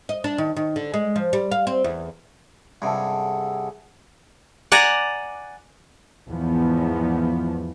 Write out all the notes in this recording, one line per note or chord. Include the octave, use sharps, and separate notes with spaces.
D#5
D4
D#3
D#3
D3
G#3
F3
G3
F5
C4
E2
G2 C3 G#4 A4 F#5
D5 F#5 G#5 A#5
E2 G#2 F3 B3